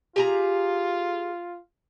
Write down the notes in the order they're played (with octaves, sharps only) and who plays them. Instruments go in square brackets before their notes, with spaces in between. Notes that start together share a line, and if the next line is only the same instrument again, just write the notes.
[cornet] F4 [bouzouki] G4 G#4 A#5